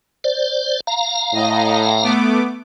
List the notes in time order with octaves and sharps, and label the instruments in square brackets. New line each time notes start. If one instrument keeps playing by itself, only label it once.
[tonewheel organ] C5 D5
F5 A#5
[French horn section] A2 [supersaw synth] D#5
[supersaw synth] A3 B3 D6